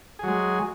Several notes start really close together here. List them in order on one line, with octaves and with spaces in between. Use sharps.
G#4 F#3 G#3